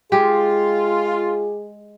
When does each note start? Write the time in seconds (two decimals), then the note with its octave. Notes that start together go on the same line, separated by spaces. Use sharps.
0.12 G#3 F4 G4 G#4